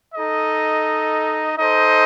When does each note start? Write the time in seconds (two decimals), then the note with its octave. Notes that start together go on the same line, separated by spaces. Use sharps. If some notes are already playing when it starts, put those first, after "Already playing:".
0.15 D#4 A4 D#5
1.58 D#4 A4 C5 D#5